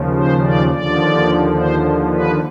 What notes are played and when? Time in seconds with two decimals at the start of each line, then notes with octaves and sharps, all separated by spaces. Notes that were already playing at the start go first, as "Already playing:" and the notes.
Already playing: D#2 C#3 F3
0.14 C5
0.43 D5
0.71 D#2 D3 F3 D5
1.55 C5
2.12 B4